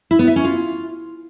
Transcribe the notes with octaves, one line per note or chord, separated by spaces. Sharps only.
E4
B3
E5
C#4
F4